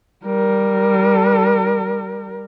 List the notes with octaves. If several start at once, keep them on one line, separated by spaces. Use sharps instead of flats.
G3 A#4